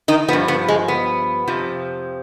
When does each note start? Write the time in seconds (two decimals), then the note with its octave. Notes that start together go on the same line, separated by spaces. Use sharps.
0.08 D#3 D#4
0.28 F3 B3
0.33 G2
0.48 B3
0.68 G#3
0.88 B3
1.47 F2 C3 F3